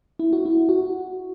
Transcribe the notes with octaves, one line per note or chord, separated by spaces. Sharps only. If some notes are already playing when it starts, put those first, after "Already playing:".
E4
F#4
E4
F#4